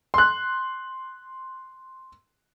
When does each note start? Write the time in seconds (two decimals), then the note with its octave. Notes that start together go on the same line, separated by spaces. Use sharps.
0.14 C6 F#6